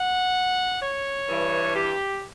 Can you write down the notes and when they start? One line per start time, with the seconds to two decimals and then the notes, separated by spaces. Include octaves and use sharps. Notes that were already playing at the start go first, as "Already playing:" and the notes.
Already playing: F#5
0.81 C#5
1.29 G2 E3
1.76 G4